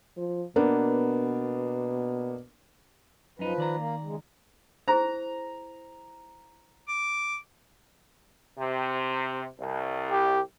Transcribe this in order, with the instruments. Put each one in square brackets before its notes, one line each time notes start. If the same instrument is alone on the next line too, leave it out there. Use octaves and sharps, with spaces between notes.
[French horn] F3
[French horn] B2 [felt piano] A#3 B3 D4
[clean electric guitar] F#2 D#4 [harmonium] F3 B4
[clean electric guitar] D#3 D5 A#5
[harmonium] A#3
C#3 G#3
[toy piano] E4 G#4 C5 [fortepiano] A#5
[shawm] D6
[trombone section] C3
C2
[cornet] G4